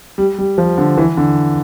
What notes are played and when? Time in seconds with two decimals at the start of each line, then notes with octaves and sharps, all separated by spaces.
0.18 G3
0.38 G3
0.58 F3
0.78 D3
0.98 E3
1.17 D3